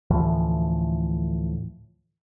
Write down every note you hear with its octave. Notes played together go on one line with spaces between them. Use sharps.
D2 A2 E3 F3